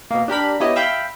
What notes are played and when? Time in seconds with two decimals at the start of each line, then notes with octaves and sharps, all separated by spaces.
0.11 B2 A#3
0.28 D4 G4 A#4 B5
0.60 B3 E4 G4 C#5 D#5
0.76 E5 F5 G5 B5